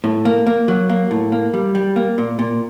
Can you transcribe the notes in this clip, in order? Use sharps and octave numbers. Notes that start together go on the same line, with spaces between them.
A2
A#3
A#3
F#3
A#3
A2
A#3
G3
G3
A#3
A#2
A#2